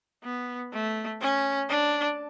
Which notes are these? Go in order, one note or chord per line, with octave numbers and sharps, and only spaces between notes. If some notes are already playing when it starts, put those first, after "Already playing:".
B3
A3
C#4
D4